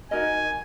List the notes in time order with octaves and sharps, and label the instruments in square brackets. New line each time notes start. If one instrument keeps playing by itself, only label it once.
[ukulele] D#4 F#4 A#4 D#5 [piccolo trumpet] G#5